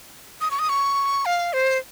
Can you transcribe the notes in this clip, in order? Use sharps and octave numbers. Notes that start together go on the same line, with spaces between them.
D#6
C#6
D#6
C#6
F5
C5